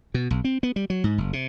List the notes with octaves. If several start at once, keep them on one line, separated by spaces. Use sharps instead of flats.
B2
B1
C4
B3
G3
F#3
G#2
F#1
C3